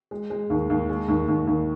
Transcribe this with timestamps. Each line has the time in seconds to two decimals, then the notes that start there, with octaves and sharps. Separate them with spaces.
0.11 G#3
0.30 G#3
0.50 D#2
0.70 D#2
0.89 G#3
1.08 D#2
1.28 D#2
1.47 D#2